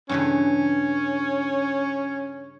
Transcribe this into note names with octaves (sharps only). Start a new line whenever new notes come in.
G2 C#3 E3 C#4